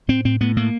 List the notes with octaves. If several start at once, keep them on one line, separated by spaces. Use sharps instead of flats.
A2 C4
A2 C4
A2 B3
A2 A#3